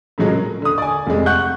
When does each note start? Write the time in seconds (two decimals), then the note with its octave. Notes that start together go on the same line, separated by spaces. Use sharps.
0.18 A2 C#3 F3 F#3 G#3
0.29 A#4
0.62 D3 D#6
0.78 D5 G#5
1.07 F1 C3 G#3
1.26 F#5 C#6 F#6 G6